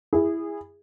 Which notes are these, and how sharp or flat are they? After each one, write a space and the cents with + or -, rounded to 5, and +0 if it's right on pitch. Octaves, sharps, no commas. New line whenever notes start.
E4 +0 G#4 -25